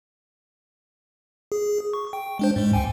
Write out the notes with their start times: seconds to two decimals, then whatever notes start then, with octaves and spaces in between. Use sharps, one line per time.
1.52 G#4
1.93 C#6
2.13 G5
2.39 G#3 D4 C5
2.56 G#2 G#3
2.73 C#2 G5 G#5